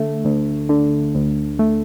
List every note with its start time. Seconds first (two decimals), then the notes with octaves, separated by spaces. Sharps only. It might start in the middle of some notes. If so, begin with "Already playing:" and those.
Already playing: D3 A3
0.25 D2
0.69 D3
1.15 D2
1.59 A3